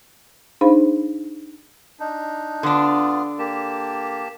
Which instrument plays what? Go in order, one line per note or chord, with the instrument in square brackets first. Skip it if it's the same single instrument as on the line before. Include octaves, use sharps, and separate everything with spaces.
[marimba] D4 D#4 G#4 C5 F5 B5
[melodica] D4 D#4
[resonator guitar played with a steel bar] D3 D4 [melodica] B3 F4
[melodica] A#3 G4 A5